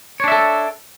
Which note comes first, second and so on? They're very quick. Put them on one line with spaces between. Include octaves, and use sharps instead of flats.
C#5 D4 E5 A4